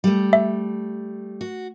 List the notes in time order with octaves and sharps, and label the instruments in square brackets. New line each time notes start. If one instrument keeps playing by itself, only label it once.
[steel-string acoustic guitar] G3 A3
[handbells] E5
[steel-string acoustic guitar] F#4